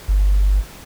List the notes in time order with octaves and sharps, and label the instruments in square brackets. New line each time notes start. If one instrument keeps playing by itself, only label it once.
[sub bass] G1